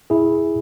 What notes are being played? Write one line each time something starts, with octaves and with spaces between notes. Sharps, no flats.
E4 G#4